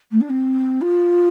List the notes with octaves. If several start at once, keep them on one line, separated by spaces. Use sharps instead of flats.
A3
D4
C4
F4